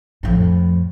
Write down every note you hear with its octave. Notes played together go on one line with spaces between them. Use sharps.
F2 A2